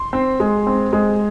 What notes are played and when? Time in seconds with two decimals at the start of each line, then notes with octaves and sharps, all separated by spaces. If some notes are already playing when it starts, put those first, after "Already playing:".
Already playing: C6
0.13 C4
0.40 G#3
0.67 C4
0.93 G#3